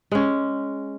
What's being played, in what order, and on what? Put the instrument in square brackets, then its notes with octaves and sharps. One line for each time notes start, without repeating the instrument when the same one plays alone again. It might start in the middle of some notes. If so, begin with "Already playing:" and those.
[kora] G#3 C#4